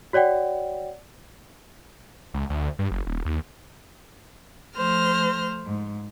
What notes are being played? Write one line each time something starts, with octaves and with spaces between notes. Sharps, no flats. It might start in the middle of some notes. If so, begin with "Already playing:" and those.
F#4 C#5 D5 F#5 G5
C#2
D2
G2
F#1
D#1
D#2
F3 A3 C5 F6 A#6
G#2